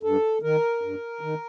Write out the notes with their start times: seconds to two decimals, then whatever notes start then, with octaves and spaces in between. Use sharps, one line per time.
0.03 G2 A4
0.42 D#3 A#4
0.82 G2
1.21 D#3